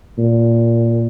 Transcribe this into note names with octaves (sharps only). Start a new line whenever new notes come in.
A#2